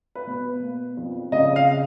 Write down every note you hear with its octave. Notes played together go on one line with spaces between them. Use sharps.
B4
B2
A#3
F2
C#3 D#5
F5